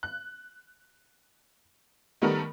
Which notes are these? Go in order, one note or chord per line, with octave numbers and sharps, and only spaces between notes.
F#6
D#3 G3 A3 B3 A4 A#4